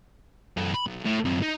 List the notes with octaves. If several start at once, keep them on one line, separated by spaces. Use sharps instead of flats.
F#2 A4
B5
B1
A2
F#2 C4
D#4